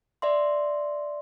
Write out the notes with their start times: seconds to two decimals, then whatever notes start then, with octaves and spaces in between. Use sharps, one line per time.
0.22 D5 E5 C6